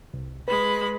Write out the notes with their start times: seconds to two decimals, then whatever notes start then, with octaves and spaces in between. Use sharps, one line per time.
0.14 C2
0.48 G#3 B4 B5